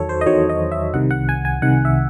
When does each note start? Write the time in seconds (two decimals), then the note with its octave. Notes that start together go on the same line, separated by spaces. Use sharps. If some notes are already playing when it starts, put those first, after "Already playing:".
Already playing: E2 D#3 F#3 A4 C#5
0.09 C5
0.21 D#5
0.26 E2 D#3 F#3 C#5
0.49 D#5
0.72 E5
0.94 C2 C3 D#3 F#5
1.11 F#5
1.29 G#5
1.45 G#5
1.62 C2 C3 D#3 F#5
1.85 E5